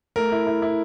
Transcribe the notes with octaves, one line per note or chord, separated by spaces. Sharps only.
A3 A#4
E4
E4
E4